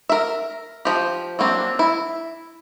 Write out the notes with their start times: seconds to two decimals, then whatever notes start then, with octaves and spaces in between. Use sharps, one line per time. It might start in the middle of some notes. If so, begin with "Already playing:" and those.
0.09 A#4 E5
0.85 F3 G4
1.39 F#3 A#3 C4 D4
1.79 E4